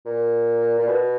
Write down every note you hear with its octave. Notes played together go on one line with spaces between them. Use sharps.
A#2
A#2
B2